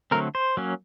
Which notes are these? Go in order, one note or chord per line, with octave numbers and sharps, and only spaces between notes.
D3 F#3 A3 C4 A#4
C5
F#3 A#3 C#4